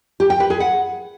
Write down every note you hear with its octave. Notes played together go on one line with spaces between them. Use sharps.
G4
G5
B4
G#4
F#5